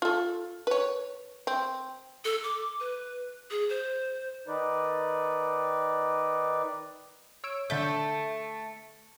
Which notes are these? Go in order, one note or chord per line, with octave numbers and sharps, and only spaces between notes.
F4 A4
B4 C#5
C4
A4
D6
B4
G#4
C5
D#3 D#4 B4 D5
C#5 E6 D7
D3 A3 E5 G6